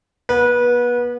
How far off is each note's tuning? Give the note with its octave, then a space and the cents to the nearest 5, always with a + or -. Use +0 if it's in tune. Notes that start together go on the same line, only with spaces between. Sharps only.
B3 -35 B4 -25